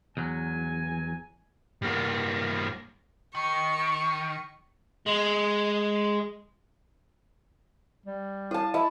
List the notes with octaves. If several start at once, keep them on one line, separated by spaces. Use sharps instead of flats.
E2 F#3 G#5
G2 A#3
D#3 C#6
G#3
G3
E4 A5 D#6
E4 D#5 A5